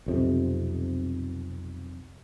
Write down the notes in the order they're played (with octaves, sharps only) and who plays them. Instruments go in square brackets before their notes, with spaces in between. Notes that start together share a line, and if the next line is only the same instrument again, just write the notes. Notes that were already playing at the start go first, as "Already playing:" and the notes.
[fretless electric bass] B1 F2 C3